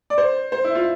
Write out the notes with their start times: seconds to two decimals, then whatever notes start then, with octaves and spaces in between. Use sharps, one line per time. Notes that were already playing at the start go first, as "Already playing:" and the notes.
0.10 D5
0.18 C5
0.52 C5
0.64 E4
0.75 F4